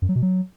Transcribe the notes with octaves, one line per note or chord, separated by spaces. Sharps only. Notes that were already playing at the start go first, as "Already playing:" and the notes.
F#2
F#3
B2
F#3